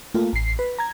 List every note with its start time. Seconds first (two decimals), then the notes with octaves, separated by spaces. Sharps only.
0.14 A3 A#3 F4
0.33 A1 C7
0.59 B4
0.79 A#5 G#6